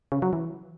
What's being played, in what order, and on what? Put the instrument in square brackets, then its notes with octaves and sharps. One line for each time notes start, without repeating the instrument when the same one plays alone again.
[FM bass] C#3
F#3
E3